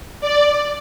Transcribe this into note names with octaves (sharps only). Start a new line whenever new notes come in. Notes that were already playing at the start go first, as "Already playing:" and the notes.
D5